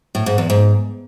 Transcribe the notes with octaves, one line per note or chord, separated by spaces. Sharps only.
A2
G#2
E2
G#2